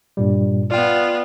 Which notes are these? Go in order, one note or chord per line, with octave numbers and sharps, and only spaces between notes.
G2 A#2 G3
B3 F4 D5 G5